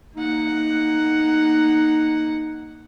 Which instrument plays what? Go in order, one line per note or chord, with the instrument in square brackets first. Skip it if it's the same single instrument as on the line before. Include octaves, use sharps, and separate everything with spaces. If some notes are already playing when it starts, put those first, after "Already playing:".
[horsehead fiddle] A#3 F#5 [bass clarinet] D#4